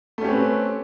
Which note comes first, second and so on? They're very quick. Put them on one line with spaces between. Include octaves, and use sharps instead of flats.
A3 C#4 G4 C4 B4